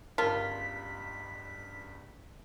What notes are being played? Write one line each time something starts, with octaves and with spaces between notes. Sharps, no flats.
G1 C#2 G2 F4 A#4 A5 B6